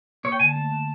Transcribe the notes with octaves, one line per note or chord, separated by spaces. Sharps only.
A#3 C#5
G5
D3 G#5
A5
A3
D3